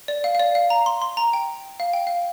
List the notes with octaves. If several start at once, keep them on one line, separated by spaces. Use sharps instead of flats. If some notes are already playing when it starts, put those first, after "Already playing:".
D5
F5
F5
D5
F5
A#5
C6
C6
A#5
G5
F5
G5
F5